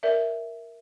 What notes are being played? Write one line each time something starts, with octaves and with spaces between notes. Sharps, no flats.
A#4 D5 E5